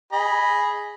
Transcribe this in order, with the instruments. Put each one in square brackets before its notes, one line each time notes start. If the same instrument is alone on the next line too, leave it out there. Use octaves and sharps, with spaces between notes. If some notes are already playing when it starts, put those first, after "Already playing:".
[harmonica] G#4 D#5 B5